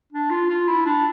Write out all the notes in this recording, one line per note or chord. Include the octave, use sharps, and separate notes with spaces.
D4
F4
F4
E4
D4